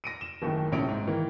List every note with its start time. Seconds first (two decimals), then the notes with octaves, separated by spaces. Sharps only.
0.04 A#6 D7 D#7
0.21 E7
0.42 F#1 D#2 A2 D#3
0.72 A#1 A2 C3 C#4 G4 D7
0.89 G#2
1.07 D#3 E3 A#3